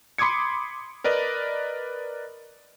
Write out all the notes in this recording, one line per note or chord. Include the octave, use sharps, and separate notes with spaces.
B5 C6 D6 D#6 G#6 C#7
A#4 B4 D5 D#5